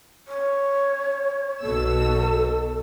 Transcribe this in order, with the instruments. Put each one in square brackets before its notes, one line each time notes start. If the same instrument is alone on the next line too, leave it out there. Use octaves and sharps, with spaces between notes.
[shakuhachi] C#5
[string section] B1 B2 E6 [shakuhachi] A4